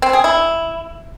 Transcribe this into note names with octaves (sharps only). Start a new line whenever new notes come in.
C4
G#4
E4